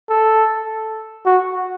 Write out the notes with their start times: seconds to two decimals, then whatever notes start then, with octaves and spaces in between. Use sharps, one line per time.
0.09 A4
1.26 F#4